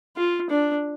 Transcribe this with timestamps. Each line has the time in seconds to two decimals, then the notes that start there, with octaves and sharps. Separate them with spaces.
0.17 F4
0.50 D4